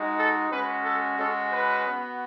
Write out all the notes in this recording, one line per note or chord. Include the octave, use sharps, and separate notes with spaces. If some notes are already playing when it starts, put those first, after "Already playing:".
Already playing: G#3 D#4 F#4
A4
G#3 C#4 F#4 B4
A4
G#3 C#4 F#4 A4
B4
B3 F#4